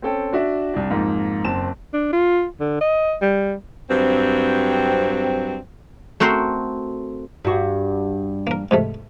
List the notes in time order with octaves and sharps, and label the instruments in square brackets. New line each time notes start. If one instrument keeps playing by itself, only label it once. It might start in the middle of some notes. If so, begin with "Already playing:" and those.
[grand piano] C4 C#4 A4 G5
D4 F#4 E5
C2 D4
F2 G#2 A#3 D#4
F#1 C4 A5 E7
[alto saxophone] D4
F4
D3
D#5
G3
[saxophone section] G2 F#3 C4
[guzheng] A3 C4 F#4 A#4 C5
[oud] G2 F#4
[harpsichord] A#3 A#4
G#2 C3 A3